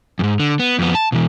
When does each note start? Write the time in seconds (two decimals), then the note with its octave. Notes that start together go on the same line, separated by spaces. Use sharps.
0.19 F2 G#2
0.40 D3
0.59 B3
0.79 F2 B3
0.95 A5
1.12 B2 E3